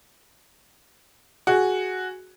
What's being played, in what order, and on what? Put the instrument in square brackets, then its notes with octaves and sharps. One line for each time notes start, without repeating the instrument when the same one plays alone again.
[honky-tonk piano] F#4 G#4